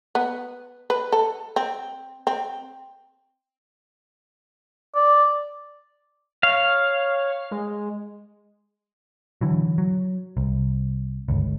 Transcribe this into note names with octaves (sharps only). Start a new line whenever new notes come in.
B3
B4
A4
C4
C4
D5
C#5 F5
G#3
D3 E3 F#3
F#3
C2
G1 C#2